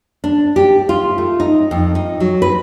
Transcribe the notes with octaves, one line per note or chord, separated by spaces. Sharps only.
D4
G4
F4
A3
D#4
F2
D#4
F#3
B4